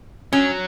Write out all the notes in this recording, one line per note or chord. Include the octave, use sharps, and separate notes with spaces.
F#3 C#4